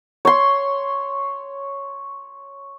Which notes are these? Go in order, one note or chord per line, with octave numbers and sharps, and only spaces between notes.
C#5 C6